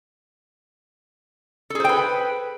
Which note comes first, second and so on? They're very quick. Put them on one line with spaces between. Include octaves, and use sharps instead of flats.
A4 G#4 C5 G5 B4